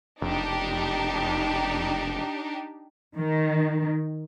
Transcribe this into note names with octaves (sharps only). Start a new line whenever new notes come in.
F1 D4 D#4 G4
D#3